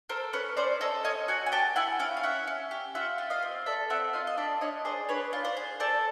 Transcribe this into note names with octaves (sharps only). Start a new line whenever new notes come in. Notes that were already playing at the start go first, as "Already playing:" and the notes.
A4 A#4 C5
C#4 B4 C#5
C#4 C5 D5
A4 C#5 D#5
C#4 C#5 D#5
F#4 F#5 G#5
G#5
G4 G5 A5
E4 F#5 G#5
C#4 F5 G5
F5
C#4 E5 F#5
C#4
G4
F4 E5 F#5
F4
D#5 F5
C4
A4 D5 E5
C4 E5 F#5
F4 D#5 F5
D#5
D4 D5 E5
D4 C#5 D#5
G#4 C5 D5
D4 B4 C#5
F4
C5 D5
G#4
A4 C5 D5